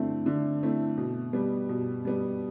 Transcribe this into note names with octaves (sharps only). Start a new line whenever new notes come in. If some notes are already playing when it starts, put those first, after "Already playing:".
Already playing: D3 A3 C4 E4
D3
A3 C4 E4
B2
G3 B3
B2
G3 B3